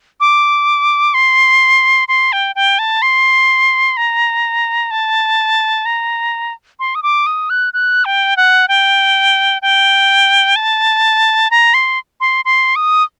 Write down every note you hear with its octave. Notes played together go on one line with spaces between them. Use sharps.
D6
C6
C6
G5
G5
A5
C6
A#5
A5
A#5
C6
D#6
D6
D#6
F#6
F#6
G5
F#5
G5
G5
A5
A#5
C6
C6
C6
D#6